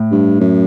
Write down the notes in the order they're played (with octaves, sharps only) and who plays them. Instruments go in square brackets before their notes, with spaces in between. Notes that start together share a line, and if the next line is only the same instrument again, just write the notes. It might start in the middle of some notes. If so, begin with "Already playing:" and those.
Already playing: [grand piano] A2
[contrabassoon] G2
F#2